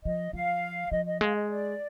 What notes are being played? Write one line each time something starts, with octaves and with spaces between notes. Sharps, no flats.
F3 D#5
F3 F5
F3 D#5
D#5
G#3 F5
D#5
D5